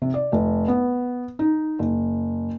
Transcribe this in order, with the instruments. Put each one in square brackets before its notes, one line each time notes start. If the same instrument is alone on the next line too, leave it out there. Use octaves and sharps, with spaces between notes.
[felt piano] C3
D5
F1
B3
D#4
F#1